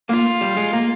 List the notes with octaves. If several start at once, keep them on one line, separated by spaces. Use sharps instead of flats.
A#3 F4
G3
G#3
A#3